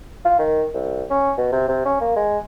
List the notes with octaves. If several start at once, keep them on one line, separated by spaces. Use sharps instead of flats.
F4
D#3
C2
C#4
B2
C3
C3
C#4
A#3
G#3